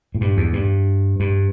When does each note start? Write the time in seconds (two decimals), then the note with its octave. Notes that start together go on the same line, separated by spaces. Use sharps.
0.15 A2
0.21 G2
0.37 E2
0.53 G2
1.20 G2